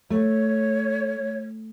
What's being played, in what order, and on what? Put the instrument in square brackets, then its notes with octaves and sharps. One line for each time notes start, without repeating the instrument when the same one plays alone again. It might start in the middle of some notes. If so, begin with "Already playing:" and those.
[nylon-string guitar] A3 [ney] C#5